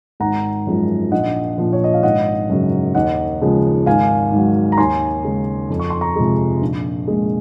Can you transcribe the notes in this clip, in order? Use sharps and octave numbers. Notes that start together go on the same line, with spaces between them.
G#1 F#5 A#5
F#2 F3 G#3
A#1 D#5 F#5
A#2 F3
C#5
D#5
F5
G#1 D#5 F#5
F#2 C#3 F#3
D#2 D#5 F#5
C#3 F3 G#3
G#1 F5 G#5
G#2 F#3
A#5
D#2 G#5 C6
C#3 G#3
F2
C#6
C6
A#5 C#6
C3 F3 G#3
A#1
A#2 G#3